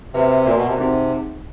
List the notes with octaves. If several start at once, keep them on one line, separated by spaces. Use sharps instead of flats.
C3 F#4 B4 E5
A#2 F#4 A#4 D5
B2
C3
C3 C4 D#4 G#4